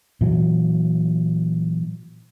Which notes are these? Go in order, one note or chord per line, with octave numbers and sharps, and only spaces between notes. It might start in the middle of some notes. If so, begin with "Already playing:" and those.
A#2 E3 F#3